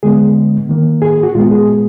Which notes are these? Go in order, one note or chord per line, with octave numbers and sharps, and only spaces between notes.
D3 G#3 B3 G#4
D#3 A#3
G#4
G#4
F#4
A#2 G#3 B3 F4
G#4